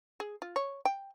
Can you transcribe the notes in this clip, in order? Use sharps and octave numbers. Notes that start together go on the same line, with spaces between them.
G#4
F4
C#5
G5